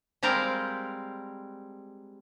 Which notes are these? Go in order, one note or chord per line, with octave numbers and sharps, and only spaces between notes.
G3 G#3 C4 A#4 F5